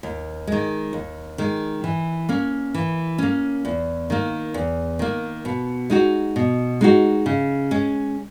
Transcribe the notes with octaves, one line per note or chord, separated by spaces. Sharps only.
D#2
D#3 G#3
D#2
D#3 G#3
E3
A#3 C#4
E3
A#3 C#4
E2
D#3 A#3
E2
D#3 A#3
B2
G#3 D#4 F#4
B2
G#3 D#4 F#4
C#3
G#3 C#4